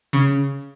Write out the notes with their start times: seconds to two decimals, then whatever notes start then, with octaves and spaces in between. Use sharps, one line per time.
0.13 C#3